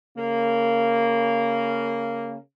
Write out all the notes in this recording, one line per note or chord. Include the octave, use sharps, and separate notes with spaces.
C#3 A#3